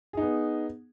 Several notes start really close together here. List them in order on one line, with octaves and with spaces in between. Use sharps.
G#4 D#4 B3